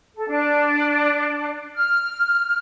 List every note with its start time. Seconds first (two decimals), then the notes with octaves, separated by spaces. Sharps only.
0.16 A4
0.28 D4
1.75 F6